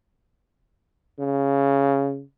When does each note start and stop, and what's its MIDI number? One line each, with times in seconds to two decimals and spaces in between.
1.19 2.22 49